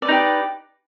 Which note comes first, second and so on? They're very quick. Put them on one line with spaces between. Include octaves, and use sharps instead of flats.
D5 B4 D#4 G4